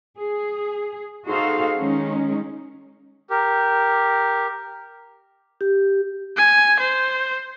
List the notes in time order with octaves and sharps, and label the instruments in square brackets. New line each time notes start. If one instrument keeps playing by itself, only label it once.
[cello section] G#4
D#4 F#4 G#4 A4 C5 F5
D#3 G#3 C#4 D#4
[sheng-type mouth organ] G4 A#4
[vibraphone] G4
[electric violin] G#5
C5